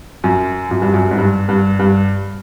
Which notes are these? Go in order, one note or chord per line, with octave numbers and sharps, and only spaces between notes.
F#2
F#2
G2
F#2
G#2
G2
G2
G2